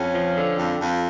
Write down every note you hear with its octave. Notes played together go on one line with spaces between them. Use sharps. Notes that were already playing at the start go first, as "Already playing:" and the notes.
Already playing: F2 C#4
F3
D3
F2
F2